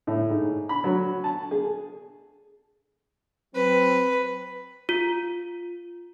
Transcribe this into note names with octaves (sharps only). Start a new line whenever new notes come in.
A2
G#2
B5
F#3
A5
G#4
F#3 C4 B4
F4